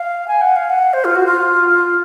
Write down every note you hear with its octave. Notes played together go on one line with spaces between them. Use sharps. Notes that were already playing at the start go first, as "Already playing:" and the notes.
Already playing: F5
G#5
F#5
F5
F#5
C5
F4
F#4
F4